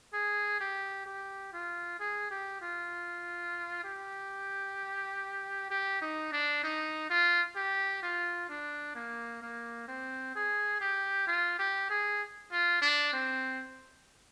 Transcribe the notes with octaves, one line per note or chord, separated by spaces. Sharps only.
G#4
G4
G4
F4
G#4
G4
F4
G4
G4
D#4
D4
D#4
F4
G4
F4
D4
A#3
A#3
C4
G#4
G4
F4
G4
G#4
F4
D4
C4